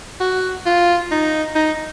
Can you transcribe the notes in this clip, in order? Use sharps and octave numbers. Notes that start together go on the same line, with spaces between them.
F#4
F4
D#4
D#4